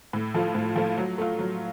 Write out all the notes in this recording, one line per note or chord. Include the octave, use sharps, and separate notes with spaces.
A2
F3 A3 F4
A2
F3 A3 F4
F#3
A3 F4
F#3